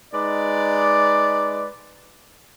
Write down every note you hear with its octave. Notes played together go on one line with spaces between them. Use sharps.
G#3 D#4 B4 D5